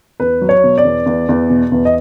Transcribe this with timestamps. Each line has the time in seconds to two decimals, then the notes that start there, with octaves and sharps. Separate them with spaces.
0.20 E2 B4
0.42 F#3
0.49 C#5
0.64 B2
0.78 D5
0.85 E2
1.06 E2
1.29 E2
1.50 B2
1.72 E2
1.85 D#5